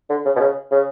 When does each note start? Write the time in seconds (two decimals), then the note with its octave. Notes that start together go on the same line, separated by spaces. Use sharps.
0.10 D3
0.25 C#3
0.36 B2
0.40 C#3
0.71 C#3